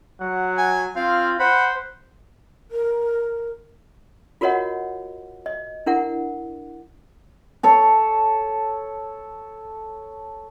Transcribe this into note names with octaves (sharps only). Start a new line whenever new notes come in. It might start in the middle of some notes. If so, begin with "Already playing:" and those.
F#3 F#5
G#5
C4 F4 F5
C5 F#5 B5
A#4
F4 F#4 A#4 C#5 D#5 F#5
D#5
D4 E4 A#4 F#5
A4 C#5 A5